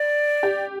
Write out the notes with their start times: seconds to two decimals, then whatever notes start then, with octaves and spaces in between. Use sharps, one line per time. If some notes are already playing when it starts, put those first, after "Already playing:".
Already playing: D5
0.43 G4